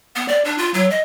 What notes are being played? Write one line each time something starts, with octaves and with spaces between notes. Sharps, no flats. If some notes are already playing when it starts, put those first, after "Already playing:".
B3
D5
D4
F4
F#3
D#5